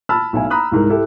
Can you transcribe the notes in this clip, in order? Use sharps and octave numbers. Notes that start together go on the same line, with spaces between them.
A5 B5 E6 F6
B1 A2 E4 G#5
A#5 B5 D#6 F#6
C2 G#2 A#4
E4 G4 A4